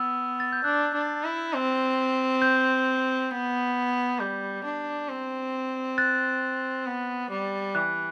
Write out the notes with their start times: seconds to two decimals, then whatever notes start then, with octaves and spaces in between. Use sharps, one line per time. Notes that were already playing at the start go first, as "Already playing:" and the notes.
Already playing: B3 E6
0.40 A6
0.53 G6
0.64 D4 F#6
0.94 D4
1.24 E4
1.53 C4
2.42 G6
3.31 B3
4.19 G3 G6
4.64 D4
5.09 C4
5.98 F#6 A6
6.86 B3
7.30 G3
7.75 E3 F#6